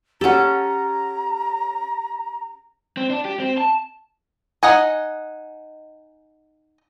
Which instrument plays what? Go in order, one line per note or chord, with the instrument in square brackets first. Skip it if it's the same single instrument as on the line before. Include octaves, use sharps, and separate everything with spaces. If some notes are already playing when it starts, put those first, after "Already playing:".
[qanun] C#4 A4 [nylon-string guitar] G4 F#5 [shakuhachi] A#5
[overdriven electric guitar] C4
D4
G4
C4
A5
[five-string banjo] D#4 D#5 F#5 G#5